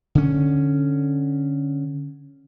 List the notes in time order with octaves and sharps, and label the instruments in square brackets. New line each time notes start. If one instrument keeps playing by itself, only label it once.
[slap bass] D3 C#4